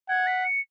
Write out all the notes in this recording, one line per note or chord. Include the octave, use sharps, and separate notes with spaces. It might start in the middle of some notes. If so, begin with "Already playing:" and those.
F#5 G#6
B6
C#7